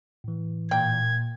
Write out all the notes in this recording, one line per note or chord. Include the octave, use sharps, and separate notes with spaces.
A2 E3
A#2 G5 G#6